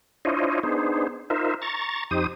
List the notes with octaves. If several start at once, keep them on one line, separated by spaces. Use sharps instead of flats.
D4 E4 F4 C5 C#5 D#5
B3 D4 D#4 G#4 C5
D#4 F4 A#4 C5 E5
A#5 C#6 A6
F2 D#4 G4 C5 D#6